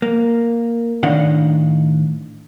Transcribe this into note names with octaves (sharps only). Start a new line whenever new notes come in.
A#3
A2 D#3 D4 D#4 F5 F#5